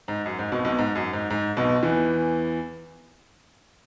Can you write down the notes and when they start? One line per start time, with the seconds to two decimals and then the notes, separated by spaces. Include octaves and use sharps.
0.08 G#2
0.26 F#2
0.39 G#2
0.52 B1 B2
0.65 B1 B2
0.78 G#2
0.95 F#2
1.13 G#2
1.30 G#2
1.57 B1 B2
1.83 E2 E3